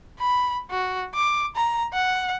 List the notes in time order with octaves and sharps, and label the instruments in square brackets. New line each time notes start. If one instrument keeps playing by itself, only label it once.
[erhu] B5
F#4
D6
A#5
F#5